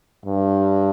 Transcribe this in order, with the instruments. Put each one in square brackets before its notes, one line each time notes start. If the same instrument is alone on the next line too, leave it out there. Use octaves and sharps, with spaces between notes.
[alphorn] G2